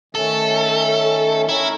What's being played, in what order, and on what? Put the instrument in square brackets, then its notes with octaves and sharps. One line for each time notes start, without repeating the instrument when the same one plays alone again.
[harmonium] D#3 A3 C#4 [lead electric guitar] A4
[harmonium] C#4 A#4 [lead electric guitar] E4